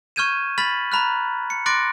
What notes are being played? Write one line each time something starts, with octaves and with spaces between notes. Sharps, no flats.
C#6 F6 G6 G#6 D#7 E7
B5 F6 A6 B6 F#7
A#5 B5 F6 F#6
C#7
C6 D6 F#6 A6 A#6 D7